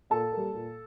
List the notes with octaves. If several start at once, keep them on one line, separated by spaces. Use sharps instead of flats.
A#2 A4 A5
G3 A#3
A#2